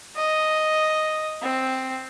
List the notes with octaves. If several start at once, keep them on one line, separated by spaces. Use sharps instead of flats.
D#5
C4